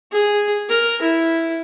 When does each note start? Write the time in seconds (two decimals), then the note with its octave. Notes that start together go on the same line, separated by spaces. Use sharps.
0.12 G#4
0.69 A#4
1.02 E4